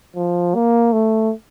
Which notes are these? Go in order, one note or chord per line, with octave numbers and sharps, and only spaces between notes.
F3
A#3
A3